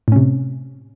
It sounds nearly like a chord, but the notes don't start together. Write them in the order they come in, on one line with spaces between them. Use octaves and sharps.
A2 C#4 C3